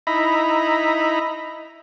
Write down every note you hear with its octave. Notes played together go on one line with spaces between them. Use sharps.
D#4 E4 A#5 B5